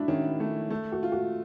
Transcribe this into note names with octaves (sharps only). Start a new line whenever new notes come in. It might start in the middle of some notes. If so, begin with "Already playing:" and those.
Already playing: D4 E4 F#4
D#3 C#4
A3
A3
F#4
F4
F#4